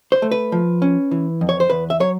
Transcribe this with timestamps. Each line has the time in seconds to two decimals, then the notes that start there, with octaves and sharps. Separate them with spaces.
0.12 C5
0.22 A3
0.31 B4
0.52 F3
0.82 C#4
1.11 E3
1.41 F2
1.49 C#5
1.60 C5
1.70 E2 B4
1.90 E5
2.00 F#3 C#5